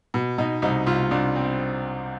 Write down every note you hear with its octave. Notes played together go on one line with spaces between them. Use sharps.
B2
B2 D#4
C2 D#4
C2 F4
C2 D4
C4